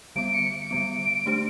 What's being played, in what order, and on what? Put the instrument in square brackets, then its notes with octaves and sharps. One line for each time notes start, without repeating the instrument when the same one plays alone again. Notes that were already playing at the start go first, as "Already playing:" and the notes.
[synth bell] D3 G3 B3 [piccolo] D7
[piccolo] C#7
D7
[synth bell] D3 G3 B3
A3 D4 G4 C5